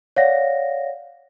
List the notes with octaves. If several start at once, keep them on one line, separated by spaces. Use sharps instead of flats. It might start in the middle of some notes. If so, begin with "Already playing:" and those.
C#5 D5 F5 F#5 A#6